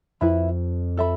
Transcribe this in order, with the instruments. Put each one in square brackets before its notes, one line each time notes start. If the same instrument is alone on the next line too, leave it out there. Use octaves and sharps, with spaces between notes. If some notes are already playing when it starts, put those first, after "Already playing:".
[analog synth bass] F2 [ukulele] E4 B4 E5 B5
[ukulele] A4 E5 B5